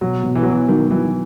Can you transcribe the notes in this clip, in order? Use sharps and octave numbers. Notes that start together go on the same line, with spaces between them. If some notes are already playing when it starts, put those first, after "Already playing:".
B2 F#3
B2
E3
F#3
E3 B3
D#3 F#3
E3 F#3